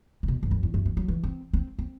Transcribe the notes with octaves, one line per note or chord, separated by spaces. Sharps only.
C3
B2
G2
F#2
E2
F#2
E3
F#3
E3
C4
C4
C4